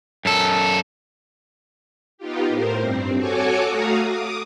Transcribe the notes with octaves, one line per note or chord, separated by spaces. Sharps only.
F#2 A4
B3 D#4 F4 G4
A2 A#4 C5
G2 C4
F#4 A4 C#5 G#5 C#6 D6
A3 F#4 F5 A#5 D#6
D6 D#6